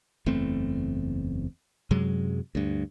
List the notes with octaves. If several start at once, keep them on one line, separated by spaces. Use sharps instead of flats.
F#1 E2 A3 C4
F#2 C3 F#3 G#3
D2 G2